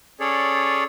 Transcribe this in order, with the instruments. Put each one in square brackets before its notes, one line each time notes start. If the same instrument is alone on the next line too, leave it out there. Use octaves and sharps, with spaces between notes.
[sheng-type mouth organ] C#4 G#4 A4 C#5 D5